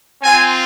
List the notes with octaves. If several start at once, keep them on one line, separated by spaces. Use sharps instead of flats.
C4 F4 G#5